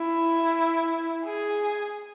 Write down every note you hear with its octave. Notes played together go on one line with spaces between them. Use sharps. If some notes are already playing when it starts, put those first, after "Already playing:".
Already playing: E4
G#4